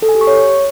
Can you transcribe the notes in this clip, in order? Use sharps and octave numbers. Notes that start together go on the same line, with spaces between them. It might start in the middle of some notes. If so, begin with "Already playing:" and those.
A4
G#5
G4
C#6
C#5